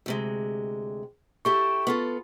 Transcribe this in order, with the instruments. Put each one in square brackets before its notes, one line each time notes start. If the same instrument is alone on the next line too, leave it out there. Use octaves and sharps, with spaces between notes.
[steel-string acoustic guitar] D2 C3 G#3
[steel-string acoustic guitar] E4 G4 A4 [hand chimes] C#6
[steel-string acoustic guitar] B3 F4 A4